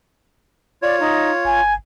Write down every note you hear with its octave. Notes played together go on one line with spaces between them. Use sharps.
F4 C#5 D5
D#4
G1 G#5